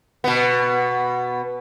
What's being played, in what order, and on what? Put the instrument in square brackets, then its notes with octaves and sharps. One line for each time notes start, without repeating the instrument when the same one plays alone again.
[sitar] B2 B3